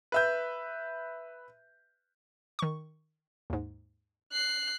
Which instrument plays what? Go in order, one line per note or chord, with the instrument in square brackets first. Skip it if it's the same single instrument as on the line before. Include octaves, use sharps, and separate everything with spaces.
[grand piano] B4 E5 G6
[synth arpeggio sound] D#3 C#6
D#2 G#2
[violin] F#6 C7